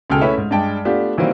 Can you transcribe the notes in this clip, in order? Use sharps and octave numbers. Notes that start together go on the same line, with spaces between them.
C#2 B2 G#4 A4 G5 F6
A3 C#4 E4 B4 C#5 E5
G#2
G2 G#3 D5 G5 A5
A3 B3 D4 F4 G4
D#3 E3 F#3 G3 A#3 C4